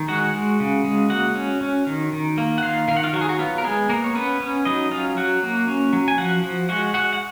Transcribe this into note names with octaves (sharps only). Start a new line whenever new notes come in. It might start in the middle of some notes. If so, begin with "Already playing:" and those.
Already playing: D#3
G#3 F#4 F#5
G#3
C#3
G#3
A#3 F#4 F#5
C#4
C#4
D#3
D#3
A#3
F#5
D#3 F4 F5
D#3 F5
F#5
F4 F5
F#3 F#4
G#4
F#4
B3 F4
A#4
G#3 B3 G#4
A#3 B3 A#4
C#5
B3 C#4 B4
C#4
F#3 D#4 D#5
C#4 F4 F5
F#3 F#4 F#5
A#3
C#4
F#3
G#5
F3 F#4 F#5
F3
G#3 F#4 F#5
G#3 F#4 F#5
F#5